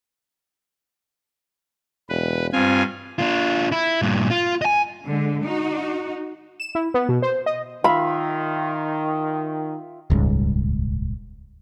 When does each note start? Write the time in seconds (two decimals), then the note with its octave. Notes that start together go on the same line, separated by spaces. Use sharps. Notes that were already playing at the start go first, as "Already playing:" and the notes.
2.09 E1 B4
2.53 G2 C4 F4 G#5
3.19 D4 F4
3.72 E4
4.02 G2 A#2
4.30 F4
4.62 D#5 G#5
5.05 D3 G#3
5.42 D#4 F#4
6.60 E7
6.75 E4
6.94 B3
7.09 B2
7.22 C5
7.46 D#5
7.84 D#3 F4 E5 B5
10.10 D#1 C#2 G#2 G3